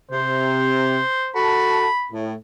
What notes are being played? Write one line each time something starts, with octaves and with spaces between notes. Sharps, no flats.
C3 C5
F#4 A4 A5 B5
A2